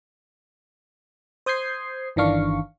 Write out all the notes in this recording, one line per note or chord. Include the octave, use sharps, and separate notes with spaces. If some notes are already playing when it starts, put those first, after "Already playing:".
C5 D#6 G6 G#6 C7
G1 D#3 E3 D4 F5 C#6